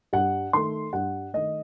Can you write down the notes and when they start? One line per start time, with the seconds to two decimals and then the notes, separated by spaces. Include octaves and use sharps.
0.13 G2 F#5
0.53 D#3 A3 C6
0.93 G2 F#5
1.33 D#3 A3 D#5